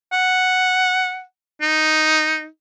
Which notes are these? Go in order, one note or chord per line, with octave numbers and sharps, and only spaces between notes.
F#5
D#4